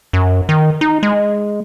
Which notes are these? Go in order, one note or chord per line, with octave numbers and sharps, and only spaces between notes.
F#2
D#3
D#4
G#3